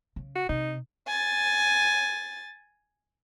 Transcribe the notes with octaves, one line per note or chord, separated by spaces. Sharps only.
C#3
F#4
C3 D#4
G#5 A6